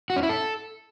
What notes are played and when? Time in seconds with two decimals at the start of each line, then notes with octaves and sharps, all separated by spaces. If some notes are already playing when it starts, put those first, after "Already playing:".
0.10 F#4
0.16 C#4
0.23 E4
0.29 A4